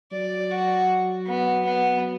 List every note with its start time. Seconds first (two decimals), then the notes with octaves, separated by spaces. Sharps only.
0.12 F#3 D5
0.51 F#4
1.26 B3
1.64 B3